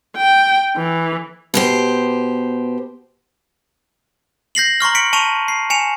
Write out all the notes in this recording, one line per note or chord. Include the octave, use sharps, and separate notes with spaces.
G5
E3
B2 G4 C5
G6 A#6 C7 F#7
A#5 C6 C#6 F6
B6 C#7 D7 F#7
A5 C#6 D#7 F7
C7
G#5 C#7 E7 F7